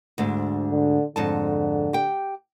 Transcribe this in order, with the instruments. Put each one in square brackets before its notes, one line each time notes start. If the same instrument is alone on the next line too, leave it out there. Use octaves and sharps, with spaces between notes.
[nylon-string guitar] D2 G#2 D4
[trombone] D3
[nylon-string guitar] F2 G#2 A5 [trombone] D3
[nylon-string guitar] G4 G5